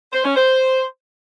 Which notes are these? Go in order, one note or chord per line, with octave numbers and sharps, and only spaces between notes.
C5
C#4
C5